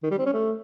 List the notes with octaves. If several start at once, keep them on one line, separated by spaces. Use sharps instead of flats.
D#3
G3
C4
C#4
A3